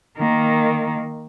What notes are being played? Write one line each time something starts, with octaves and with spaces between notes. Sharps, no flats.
D#3 A#3